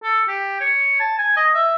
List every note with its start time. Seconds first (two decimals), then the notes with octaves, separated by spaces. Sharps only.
0.03 A4
0.28 G4
0.61 C#5
1.00 A5
1.18 G#5
1.36 D#5
1.54 E5